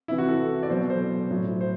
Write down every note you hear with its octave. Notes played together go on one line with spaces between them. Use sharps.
C3 E3 E4
F#4
A4
D5
B2 F#3 C5
D5
C5
A2 F#3
C5